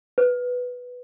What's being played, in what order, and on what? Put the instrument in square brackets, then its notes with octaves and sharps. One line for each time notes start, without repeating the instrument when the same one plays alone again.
[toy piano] B4